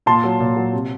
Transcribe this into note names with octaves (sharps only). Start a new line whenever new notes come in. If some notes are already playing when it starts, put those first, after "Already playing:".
A#2 A5 C6
F#3
A#2
F#3
C3